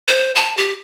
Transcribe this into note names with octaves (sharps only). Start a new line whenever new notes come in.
C5
A5
G4